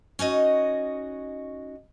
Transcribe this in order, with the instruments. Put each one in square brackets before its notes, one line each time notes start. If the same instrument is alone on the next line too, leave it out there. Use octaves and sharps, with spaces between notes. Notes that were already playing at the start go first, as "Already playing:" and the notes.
[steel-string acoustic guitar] C#4 D#4 F#4 D#5